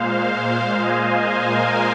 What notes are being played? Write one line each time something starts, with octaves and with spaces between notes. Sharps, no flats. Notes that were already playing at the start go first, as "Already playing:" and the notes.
Already playing: A#2 G#3 C5 F5
D#5 G#5
C5 F5
A#4 D#5